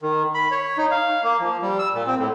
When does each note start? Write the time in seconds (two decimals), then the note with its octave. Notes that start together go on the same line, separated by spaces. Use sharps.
0.02 D#3
0.34 B5
0.51 C#5
0.77 D#4
0.91 F5
1.23 A#3
1.40 F3
1.62 G3
1.79 E6
1.94 A#2
2.07 C4
2.19 A2